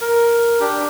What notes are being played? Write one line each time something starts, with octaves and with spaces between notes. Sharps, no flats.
A#4
D4 G4